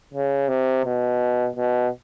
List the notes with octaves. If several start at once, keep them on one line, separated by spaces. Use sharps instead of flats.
C#3
C3
B2
B2